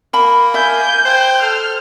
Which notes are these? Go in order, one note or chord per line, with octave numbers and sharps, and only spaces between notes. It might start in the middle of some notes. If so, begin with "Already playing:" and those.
A#3 B5
E5 G#5 G6
C5 G5
A4 F6